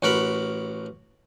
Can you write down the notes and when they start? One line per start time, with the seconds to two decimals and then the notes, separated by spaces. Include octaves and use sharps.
0.02 A1 F#4 A#4 B5